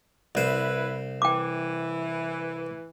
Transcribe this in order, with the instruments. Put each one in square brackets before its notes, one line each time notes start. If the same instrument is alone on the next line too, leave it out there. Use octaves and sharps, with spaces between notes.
[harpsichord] C2 C5 [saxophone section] E4 B4
[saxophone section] E3 [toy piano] G5 D6